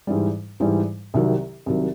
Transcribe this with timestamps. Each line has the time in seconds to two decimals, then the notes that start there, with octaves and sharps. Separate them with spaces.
0.07 G#2 E3 G3
0.60 G#2 E3 G3
1.14 C2 C3 D#3 F#3
1.66 C2 C3 D#3 F#3